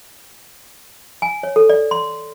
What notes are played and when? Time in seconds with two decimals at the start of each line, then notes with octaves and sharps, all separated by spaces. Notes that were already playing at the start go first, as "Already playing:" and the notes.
1.22 G#5
1.43 C#5
1.56 A4
1.69 D5
1.91 C6